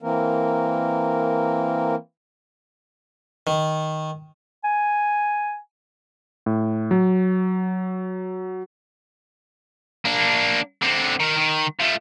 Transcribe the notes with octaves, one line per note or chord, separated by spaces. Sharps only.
E3 A#3 C4 A#4
D#3
G#5
A2
F#3
A#3 D4
D3 C4
D#3 A#4
D#3
F3 A3